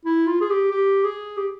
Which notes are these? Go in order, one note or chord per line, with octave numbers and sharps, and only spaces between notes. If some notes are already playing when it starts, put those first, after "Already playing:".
E4
F4
G#4
G4
G4
G#4
G4